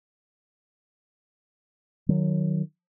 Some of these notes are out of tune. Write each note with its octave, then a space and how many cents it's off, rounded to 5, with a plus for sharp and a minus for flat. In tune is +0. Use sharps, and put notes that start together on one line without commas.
D#3 -20 F#3 -5